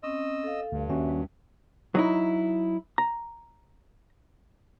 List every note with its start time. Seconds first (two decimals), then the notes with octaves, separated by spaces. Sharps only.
0.03 C4 C#4 D#5 E6
0.44 A4 F5
0.72 D2 G2
0.89 D#2 C#4 F#4 E5
1.09 G3
1.95 F#3 D#4 E4
2.98 A#5